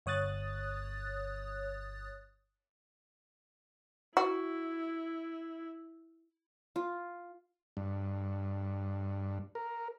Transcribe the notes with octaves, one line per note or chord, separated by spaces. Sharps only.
G1 C#5 D#6 F#6 A6
E4 F#4
F4
G2
A#4